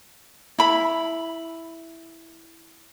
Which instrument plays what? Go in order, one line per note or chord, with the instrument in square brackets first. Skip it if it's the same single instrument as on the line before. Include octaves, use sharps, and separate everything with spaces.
[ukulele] E4 B5